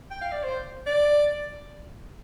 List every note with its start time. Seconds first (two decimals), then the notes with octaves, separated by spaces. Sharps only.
0.10 G5
0.21 F5
0.32 D5
0.43 C5
0.87 D5